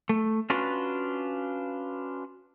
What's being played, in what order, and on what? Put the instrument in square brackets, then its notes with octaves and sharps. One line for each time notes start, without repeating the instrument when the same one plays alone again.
[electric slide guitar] A3
C#4 D4 F4 F#4 B4